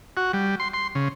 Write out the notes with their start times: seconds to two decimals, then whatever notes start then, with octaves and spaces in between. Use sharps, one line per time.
0.17 F#4
0.33 G3
0.60 C6
0.74 C6
0.95 C#3